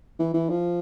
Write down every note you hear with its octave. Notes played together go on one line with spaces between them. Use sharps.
E3
E3
F3